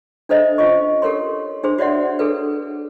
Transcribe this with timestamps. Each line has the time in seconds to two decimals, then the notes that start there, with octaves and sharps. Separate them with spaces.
0.29 D4 A4 C5 D#5 E5
0.58 C#4 F4 C#5 D#5 C#6
1.02 G4 A4 A#4 C#5 C6
1.63 D4 G#4 C5 C6
1.79 F#4 C#5 D5 E5 F#5 C6
2.19 D4 G#4 A4 B4